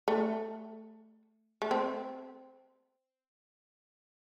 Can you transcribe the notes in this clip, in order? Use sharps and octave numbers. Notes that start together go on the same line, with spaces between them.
A3
A3
C4